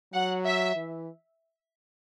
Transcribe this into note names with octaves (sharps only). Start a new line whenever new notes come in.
F#3 F#5
E5
E3